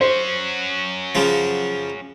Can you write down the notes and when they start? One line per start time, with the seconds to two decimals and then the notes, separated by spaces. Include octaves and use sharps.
0.01 C#4 F#4 C5
1.15 C#3 F3